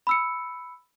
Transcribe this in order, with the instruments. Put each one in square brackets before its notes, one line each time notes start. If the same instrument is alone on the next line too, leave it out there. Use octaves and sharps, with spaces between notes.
[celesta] B5 E6 C#7